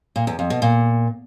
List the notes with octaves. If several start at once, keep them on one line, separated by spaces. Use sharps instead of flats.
A#2
E2
F2
B2
A#2